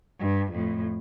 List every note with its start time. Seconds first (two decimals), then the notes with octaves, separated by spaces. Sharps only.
0.20 G2
0.52 F2 A2